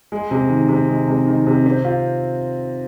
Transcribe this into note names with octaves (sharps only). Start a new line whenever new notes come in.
G#3
C3
D#3
C3
G#3
C3
D#3
C3
C4
F4